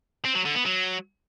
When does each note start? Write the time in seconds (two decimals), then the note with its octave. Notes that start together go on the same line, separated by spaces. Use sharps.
0.25 C4
0.35 F#3
0.45 D3
0.55 B3
0.66 F#3